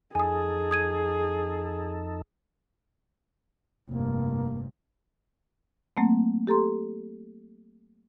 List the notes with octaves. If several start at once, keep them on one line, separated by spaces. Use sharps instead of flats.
F2 D#4 G#4 A4 G#5 D#6
D#6 G#6 D#7
F1 G2 A#3
F#3 A3 A#3 C4
G4 A4 A#5 C6